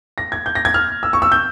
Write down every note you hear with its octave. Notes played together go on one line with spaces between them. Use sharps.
A#6
G#6
G6
A#6
G#6
F6
E6
C#6
E6
G6